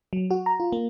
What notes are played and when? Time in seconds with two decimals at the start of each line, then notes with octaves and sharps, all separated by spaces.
0.13 F#3
0.31 F#4
0.46 A#5
0.60 F4
0.72 A#3